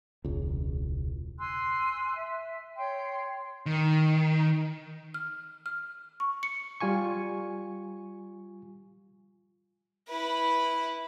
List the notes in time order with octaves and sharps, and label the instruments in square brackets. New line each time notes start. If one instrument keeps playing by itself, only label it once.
[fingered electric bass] E1 C#2
[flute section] G#5 C6 E6 F#6
E5
C#5 G5 C6
[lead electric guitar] D#3
[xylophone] F6
F6
C#6
C#7
[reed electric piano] G3 F4 G#5 C#6
[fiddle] E4 B4